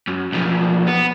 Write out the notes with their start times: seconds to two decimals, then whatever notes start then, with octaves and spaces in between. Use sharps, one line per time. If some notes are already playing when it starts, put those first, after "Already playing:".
0.07 F#2
0.32 B1 F3
0.87 B3